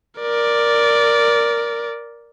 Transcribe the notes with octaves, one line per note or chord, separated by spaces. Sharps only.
A#4 D5